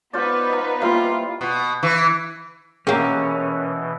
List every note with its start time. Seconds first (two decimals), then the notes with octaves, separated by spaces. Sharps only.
0.13 B3 D#4 F4 B4 C5 D5
0.49 D#5 A#5
0.82 G3 A#3 E4 F4
1.41 B2
1.83 E3
2.87 B2 E3 A#3 C#4 G4 G#4 A#4 F#5